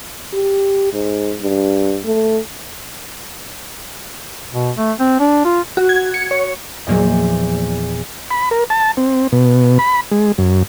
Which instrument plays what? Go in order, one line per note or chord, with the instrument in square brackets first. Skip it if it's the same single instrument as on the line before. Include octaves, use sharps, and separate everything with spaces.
[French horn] G4
G#2
G2
A3
[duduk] B2
A3
C4
D4
F4
[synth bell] F#4
G#6
C#7
C#5
[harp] E2 A#2 F3 [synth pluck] F#3 A#3 D#5
[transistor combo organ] B5
A#4
A5
C4
B2
B5
G#3
F#2